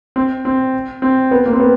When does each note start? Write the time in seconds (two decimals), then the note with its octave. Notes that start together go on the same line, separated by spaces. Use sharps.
0.16 C4
0.45 C4
1.02 C4
1.31 B3
1.46 A#3
1.53 C4
1.60 B3